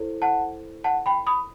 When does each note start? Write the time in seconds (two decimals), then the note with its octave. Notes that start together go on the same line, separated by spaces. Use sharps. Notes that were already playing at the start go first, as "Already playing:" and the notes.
Already playing: E4 A4 C5
0.22 F#5 A5
0.84 F#5 A5
1.06 G5 B5
1.27 B5 D#6